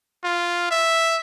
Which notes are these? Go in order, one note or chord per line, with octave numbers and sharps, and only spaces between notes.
F4
E5